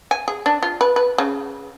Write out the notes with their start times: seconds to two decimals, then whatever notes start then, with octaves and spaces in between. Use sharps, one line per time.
0.11 G#5
0.28 G#4
0.46 D4
0.63 F4
0.81 B4
0.96 B4
1.18 C#3